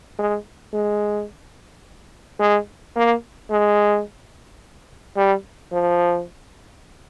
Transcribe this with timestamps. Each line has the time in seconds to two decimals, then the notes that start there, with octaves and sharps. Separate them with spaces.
0.19 G#3
0.73 G#3
2.40 G#3
2.96 A#3
3.50 G#3
5.16 G3
5.72 F3